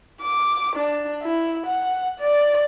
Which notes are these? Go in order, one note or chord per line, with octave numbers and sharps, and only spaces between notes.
D6
D4
E4
F#5
D5